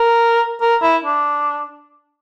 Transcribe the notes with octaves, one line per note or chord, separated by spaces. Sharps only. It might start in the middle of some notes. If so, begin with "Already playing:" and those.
Already playing: A#4
A#4
E4
D4